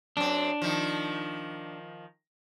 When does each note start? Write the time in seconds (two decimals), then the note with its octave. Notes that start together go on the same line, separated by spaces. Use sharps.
0.17 F#2 C4 D4
0.62 D#3 F3